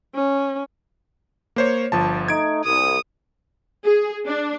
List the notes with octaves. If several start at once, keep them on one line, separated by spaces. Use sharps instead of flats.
C#4
A#3 C5 C#5
G1 F3 A5
A3 D#4 G#6 D7
C2 D#6
G#4
D4